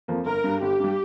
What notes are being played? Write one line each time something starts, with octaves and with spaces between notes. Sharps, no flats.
F2 F3 A#3
G1 A#4
G2 G3
G1 G4
G2 G3